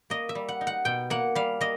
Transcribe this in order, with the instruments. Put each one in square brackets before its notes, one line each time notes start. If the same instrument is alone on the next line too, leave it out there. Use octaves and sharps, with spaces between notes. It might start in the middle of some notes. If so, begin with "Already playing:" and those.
[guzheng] A#3 D#5
E5
G3
F#5
D#4
F#5
B2 G5
A#3 F#5
G3 F5
A#3 D#5